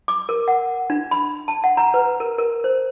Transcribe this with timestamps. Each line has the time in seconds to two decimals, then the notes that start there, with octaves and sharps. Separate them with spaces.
0.08 D6
0.29 A#4
0.48 F#5
0.90 D4
1.11 B5
1.48 A5
1.64 F#5
1.77 A#5
1.94 B4
2.20 A#4
2.39 A#4
2.64 C5